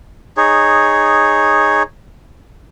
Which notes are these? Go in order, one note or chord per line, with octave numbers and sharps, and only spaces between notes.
D#4 G#4 C#5